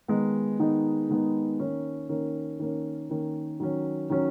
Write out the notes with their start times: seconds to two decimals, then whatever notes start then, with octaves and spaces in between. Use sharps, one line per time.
0.08 D#3 G#3 B3 D#4
0.59 D#3 G#3 B3 D#4
1.09 D#3 G#3 B3 D#4
1.60 D#3 A#3 C#4
2.09 D#3 A#3 C#4
2.59 D#3 A#3 C#4
3.09 D#3 A#3 C#4
3.60 D#3 F#3 C#4
4.10 D#3 F#3 C#4